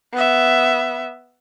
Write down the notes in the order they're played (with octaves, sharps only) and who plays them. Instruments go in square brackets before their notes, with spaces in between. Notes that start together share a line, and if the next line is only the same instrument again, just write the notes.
[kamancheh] B3 E5